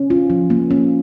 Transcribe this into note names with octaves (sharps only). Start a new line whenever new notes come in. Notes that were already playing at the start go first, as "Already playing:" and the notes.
Already playing: C#4
F4
F3
A#3
C#4